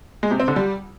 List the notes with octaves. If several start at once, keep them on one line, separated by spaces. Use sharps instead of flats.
G#3
C3
C4
D3
G3